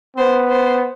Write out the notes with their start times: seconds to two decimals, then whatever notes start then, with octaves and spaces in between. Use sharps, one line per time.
0.16 B3 C5
0.50 C5